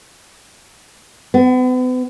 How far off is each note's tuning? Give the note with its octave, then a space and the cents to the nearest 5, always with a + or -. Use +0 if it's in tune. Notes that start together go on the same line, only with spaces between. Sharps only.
B3 +40